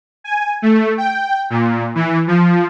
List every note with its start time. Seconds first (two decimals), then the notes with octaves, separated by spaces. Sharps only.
0.24 G#5
0.62 A3
0.98 G5
1.50 A#2
1.95 E3
2.27 F3